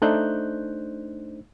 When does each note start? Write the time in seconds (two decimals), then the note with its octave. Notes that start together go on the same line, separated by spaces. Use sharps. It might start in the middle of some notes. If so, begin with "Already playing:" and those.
0.02 A3 D4 D#4 C5 F#6 G6